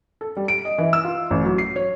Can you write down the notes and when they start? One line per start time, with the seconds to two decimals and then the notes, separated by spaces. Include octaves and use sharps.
0.21 A4
0.36 G3
0.48 D7
0.65 D#5
0.78 E3
0.93 E6
1.05 F4
1.30 A1
1.45 F#3
1.58 C7
1.76 C#5